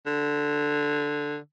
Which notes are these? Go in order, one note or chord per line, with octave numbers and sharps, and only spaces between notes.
D3